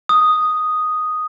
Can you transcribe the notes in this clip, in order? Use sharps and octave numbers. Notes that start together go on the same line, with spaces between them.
D#6